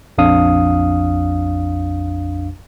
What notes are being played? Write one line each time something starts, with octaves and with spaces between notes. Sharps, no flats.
A#1 F2 D4 F5 D#6